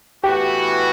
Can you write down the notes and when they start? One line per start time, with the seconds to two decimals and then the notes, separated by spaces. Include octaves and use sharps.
0.24 A2 E3 B3 F#4 G4